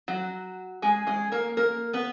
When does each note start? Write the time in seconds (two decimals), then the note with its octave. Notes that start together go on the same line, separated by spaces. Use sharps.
0.08 F#3 F#4
0.82 G#3 G#4
1.07 G#3 G#4
1.32 A#3 A#4
1.57 A#3 A#4
1.93 B3 B4